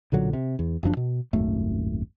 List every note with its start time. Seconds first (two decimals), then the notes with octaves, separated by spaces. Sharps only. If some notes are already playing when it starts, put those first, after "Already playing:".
0.12 B1 A#2 D3 F#3
0.33 C3
0.59 E2
0.83 F#1 F#2 F3 D4
0.97 B2
1.33 D#1 G#1 F#2 A3